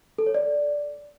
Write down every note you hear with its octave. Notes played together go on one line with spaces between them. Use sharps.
A4
C#5
D5